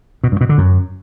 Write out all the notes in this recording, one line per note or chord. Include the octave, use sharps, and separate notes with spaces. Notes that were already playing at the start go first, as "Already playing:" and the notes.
B2
G2
B2
D3
F#2